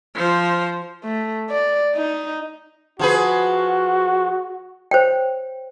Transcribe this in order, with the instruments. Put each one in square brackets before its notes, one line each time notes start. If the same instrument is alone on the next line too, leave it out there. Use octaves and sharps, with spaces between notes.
[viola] F3 C5
[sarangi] A3
D5
D#4
[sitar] F3 G#4 B4 [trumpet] F#4
[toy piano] C5 C#5 G5